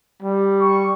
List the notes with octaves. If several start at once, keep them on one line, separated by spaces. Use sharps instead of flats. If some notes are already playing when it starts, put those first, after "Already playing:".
G3
C#6